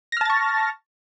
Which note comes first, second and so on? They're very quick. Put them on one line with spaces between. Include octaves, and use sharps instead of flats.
A#6 F6 A5 A6 C#6